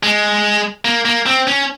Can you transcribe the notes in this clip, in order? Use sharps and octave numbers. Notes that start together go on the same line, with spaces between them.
G#3
A#3
A#3
C4
C#4